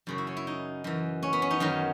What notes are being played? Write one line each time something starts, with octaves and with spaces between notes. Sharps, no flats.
F#2 C#3 F#3
E4
C#4
E4
D#4
F#2 E3
C#4
B3
C#4
D#4
F#2 D#3 F#3